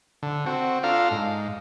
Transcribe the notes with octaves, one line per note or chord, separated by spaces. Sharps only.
D3
C4 F#4
D4 F4 A4 F5 A#5
G#2